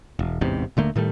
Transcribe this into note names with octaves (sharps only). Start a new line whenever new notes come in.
E1
A1 E2 G#2 C3
D#1 D3 A3 A#3
A2 D#3 G3 A3